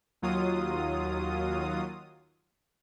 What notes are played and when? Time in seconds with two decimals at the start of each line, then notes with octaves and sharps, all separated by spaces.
0.22 D#2 F#3 F4 D#6